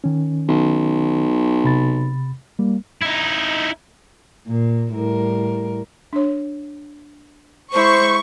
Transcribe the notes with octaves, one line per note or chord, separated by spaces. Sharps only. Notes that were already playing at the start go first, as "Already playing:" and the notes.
D#3 C#4
B1
C3 B5 A6
G3 A#3
D#4 E4
A#2
A2 G3 A#4
D4 C#5
G#3 E4 C5 C#6